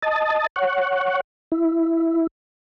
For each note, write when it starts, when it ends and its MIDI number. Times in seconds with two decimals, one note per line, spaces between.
0.02 0.47 75
0.02 0.47 81
0.56 1.21 73
0.56 1.21 78
1.52 2.27 64